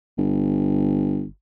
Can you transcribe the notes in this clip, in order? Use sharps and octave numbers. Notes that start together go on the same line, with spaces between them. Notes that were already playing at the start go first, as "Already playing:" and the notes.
G1